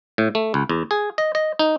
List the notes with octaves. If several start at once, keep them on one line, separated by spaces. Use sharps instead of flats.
A2
A3
C#2
E2
G#4
D#5
D#5
D#4